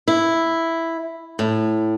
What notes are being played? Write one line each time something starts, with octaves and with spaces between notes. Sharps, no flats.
E4
A2